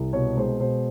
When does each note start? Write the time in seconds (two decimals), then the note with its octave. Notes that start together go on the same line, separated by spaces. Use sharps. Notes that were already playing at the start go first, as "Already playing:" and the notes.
Already playing: C2
0.13 B2 C#5
0.37 G#3 C5
0.60 B2 C5